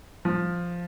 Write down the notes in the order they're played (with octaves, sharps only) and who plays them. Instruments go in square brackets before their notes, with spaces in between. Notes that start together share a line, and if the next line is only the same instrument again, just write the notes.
[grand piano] F3